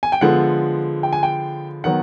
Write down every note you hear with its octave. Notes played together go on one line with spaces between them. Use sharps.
G#5
G5
D3 F3 G#3 B3 F#5
G5
G#5
G5
D#3 F#3 B3 F#5